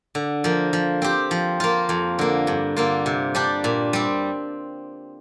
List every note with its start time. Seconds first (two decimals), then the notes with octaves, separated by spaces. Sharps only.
0.15 D3
0.44 F3 A#3
0.73 F3
1.02 C4 G4
1.31 F3
1.60 A#3 F4
1.89 F2
2.19 D3 A#3
2.47 G2
2.77 D3 A#3 F4
3.06 C3
3.35 G3 D4 G4
3.64 A#2
3.93 G3 C4